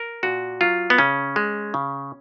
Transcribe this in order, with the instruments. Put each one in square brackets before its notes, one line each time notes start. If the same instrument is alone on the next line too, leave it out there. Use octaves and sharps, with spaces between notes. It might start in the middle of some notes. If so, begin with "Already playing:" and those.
Already playing: [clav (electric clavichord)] A#4
A#2 F#4
F#3 F4
B3
C#3 C#4
G#3
C#3